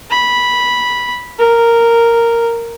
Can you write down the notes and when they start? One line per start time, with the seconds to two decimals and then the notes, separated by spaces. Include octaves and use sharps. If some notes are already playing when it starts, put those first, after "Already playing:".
0.10 B5
1.39 A#4